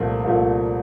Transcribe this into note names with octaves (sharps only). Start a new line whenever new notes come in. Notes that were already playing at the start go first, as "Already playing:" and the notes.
Already playing: C2 A#2 F3 A3
C2 A#2 F3 A3